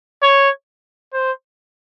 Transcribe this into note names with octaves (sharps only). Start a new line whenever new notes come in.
C#5
C5